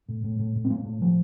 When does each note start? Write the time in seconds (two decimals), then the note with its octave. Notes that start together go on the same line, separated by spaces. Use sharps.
0.09 A2
0.24 A2
0.39 A2
0.55 A2
0.65 C4
0.70 A2 A#3
0.86 A2
1.01 A2 F3